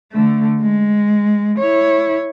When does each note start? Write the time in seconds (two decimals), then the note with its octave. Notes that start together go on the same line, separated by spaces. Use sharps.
0.12 D3 A3
0.61 G#3
1.59 E4 C#5